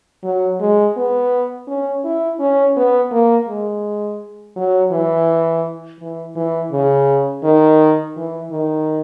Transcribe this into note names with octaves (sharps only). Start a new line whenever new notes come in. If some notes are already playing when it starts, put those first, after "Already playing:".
F#3
G#3
B3
C#4
E4
C#4
B3
A#3
G#3
F#3
E3
E3
E3
C#3
D#3
E3
D#3